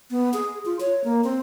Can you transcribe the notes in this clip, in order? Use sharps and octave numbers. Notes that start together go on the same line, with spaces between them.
B3
G#4
F4
C#5
A#3
C4